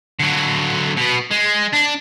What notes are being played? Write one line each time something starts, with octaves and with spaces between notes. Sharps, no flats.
D3 F#3
B2 B3
G#3
D4